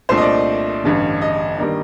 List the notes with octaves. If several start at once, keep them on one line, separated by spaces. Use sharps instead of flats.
C2 A#2 A3 D4 C5
D#5
D5
A1 G2 D3
D#5
D#3 G3 A#3 D4